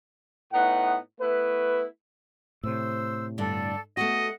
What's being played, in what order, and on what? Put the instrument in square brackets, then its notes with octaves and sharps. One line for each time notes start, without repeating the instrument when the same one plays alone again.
[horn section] A2 B3 D#4 F#5
A3 B3 E4 B4
[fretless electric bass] A2 C3 [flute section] C5 E6
[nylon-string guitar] G2 D3 [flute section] A4 D5
[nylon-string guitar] A3 B3 F#4 [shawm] D#5 [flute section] F#5